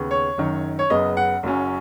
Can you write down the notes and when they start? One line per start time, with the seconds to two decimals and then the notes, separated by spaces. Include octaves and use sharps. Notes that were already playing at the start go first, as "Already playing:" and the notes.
Already playing: D#2 C#3 B3
0.11 C#5
0.38 F#1 F#2 D#3
0.79 C#5
0.90 F#1 F#2 C#3 B3 D#5
1.17 F#5
1.43 F#1 F#2 F#3 C#4